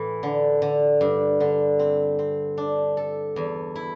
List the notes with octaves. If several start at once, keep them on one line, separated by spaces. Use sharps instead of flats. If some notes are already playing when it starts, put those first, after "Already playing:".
Already playing: A2 E3 E4
D3
D3
G2
D3
C4
C4
D4
A4
E2
E4